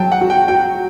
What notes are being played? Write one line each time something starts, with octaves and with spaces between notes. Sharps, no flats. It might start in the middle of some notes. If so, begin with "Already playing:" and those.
Already playing: F#3 G5 A5
F#5
F#4
G5
F#4 G5